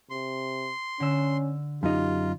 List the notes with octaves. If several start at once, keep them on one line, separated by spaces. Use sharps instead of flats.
C3 C6
D3 C#4 E6
F#2 D#4 F4 G4